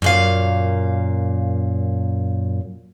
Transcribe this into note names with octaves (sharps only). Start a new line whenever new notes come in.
F#2 A#2 F5